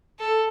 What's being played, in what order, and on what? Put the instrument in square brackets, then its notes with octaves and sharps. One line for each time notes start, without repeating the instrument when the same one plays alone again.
[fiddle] A4